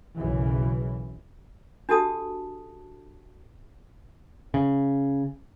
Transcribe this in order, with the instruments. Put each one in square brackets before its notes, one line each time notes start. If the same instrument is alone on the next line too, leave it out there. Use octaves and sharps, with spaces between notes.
[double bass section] B1 F#2 C#3 E3
[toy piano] D4 F#4 G4 A4 A5 D#6
[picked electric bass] C#3